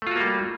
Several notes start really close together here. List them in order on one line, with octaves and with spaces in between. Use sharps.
A3 F4 F#4 A#3 G3